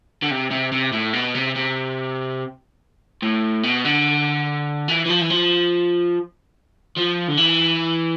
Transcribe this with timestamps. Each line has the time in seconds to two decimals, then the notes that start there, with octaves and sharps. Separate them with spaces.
0.22 D3
0.31 C3
0.51 C3
0.72 C3
0.93 A2
1.13 B2
1.34 C3
1.55 C3
3.22 A2
3.63 B2
3.85 D3
4.88 E3
5.05 E3
5.09 F3
5.21 E3
5.30 F3
6.97 F3
7.28 D3
7.37 E3